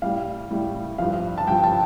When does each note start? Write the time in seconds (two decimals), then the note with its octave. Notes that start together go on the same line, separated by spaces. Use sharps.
0.02 A2 G3 F5
0.50 A2 G3
0.98 G2 F3 F5
1.38 A5
1.47 G2 F3 G5
1.64 A5